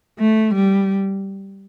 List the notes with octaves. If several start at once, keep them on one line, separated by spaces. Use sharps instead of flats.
A3
G3